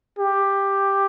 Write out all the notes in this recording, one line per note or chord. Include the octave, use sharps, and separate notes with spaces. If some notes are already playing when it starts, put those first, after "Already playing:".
G4